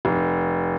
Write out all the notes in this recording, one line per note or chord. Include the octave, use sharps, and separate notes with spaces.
F1